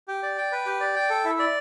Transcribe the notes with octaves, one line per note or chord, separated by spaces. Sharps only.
G4
D5
G5
B4
G4
D5
G5
A4
E4
D5